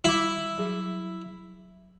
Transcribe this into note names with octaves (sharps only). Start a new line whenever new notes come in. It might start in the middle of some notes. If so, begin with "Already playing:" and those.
G3 E4 B5 D6
F#3 G#4